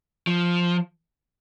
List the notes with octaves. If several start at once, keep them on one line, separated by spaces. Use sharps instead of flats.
F3